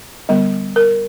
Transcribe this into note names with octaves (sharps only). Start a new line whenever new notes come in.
D3 G3 B3
A#4